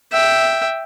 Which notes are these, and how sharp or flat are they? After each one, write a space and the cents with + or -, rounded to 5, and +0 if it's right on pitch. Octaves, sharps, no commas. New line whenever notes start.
E5 +0 G5 +0